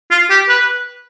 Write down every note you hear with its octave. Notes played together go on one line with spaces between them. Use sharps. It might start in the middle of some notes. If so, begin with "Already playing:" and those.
F4
G4
B4